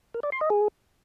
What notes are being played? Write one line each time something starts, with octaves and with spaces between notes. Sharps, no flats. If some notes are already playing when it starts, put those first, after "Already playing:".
A#4
D5
C6
D#5
G#4